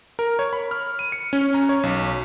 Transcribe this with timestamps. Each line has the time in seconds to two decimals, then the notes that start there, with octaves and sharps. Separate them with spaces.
0.19 A#4
0.39 C#5
0.53 B5
0.71 F6
0.99 D#7
1.12 C#7
1.33 C#4
1.54 A#5
1.69 C#5
1.83 B1